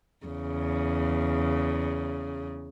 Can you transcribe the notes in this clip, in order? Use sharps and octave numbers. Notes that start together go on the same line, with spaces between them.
E2 C#3